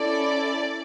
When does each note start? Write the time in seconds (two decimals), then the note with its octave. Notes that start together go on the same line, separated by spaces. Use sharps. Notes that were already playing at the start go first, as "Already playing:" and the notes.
Already playing: C#4 E4 A4 D5